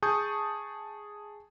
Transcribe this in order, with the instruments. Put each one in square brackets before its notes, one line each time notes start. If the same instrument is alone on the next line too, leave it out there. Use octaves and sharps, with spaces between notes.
[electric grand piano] G#4 G#5 A5 C#6 D#6 G6